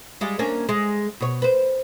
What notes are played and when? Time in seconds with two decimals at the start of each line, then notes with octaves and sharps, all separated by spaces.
0.21 G3 G#3 F4
0.39 A#3 C#4 D4
0.69 G#3
1.21 B2 C#5
1.42 B4 C5